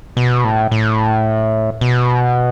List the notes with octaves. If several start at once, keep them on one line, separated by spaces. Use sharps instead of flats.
B2
A2
A2
B2